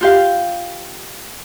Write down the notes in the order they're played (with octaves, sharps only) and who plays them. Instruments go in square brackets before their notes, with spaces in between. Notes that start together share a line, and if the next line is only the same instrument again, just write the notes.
[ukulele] F4 G4 F5